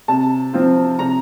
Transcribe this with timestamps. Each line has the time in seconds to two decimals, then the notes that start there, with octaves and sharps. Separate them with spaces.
0.08 C3 A5
0.53 F3 C4 F4
0.99 C3 A#5